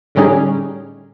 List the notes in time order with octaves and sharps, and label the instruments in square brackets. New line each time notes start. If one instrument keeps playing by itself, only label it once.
[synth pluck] A2 D3 G3 C#4 D#4 G#4